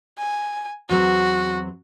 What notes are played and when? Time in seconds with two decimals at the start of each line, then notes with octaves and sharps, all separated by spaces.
0.18 G#5
0.89 E2 F#3 C4 F#4